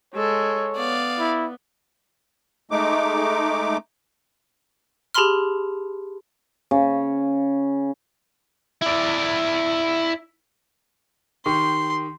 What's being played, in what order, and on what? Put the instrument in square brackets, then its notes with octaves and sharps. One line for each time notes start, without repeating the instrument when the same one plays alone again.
[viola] G#3 A4 [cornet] C#5
[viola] B3 [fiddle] D5 F5
[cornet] E4
[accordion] G#3 A3 D#4 D6
[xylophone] G4 G#4 A5 B5 C6 F6
[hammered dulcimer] C#3
[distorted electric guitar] E4 D5
[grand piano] D#3 G4 C#6 [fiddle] C6